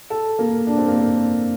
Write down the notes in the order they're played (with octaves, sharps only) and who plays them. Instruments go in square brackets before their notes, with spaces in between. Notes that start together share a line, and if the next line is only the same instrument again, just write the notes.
[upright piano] A4
A#3
D4
C4
A#3
C4